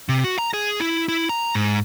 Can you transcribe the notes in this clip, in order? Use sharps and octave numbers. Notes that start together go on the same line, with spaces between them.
C3
F#4
A#5
G#4
E4
E4
A#5
G#2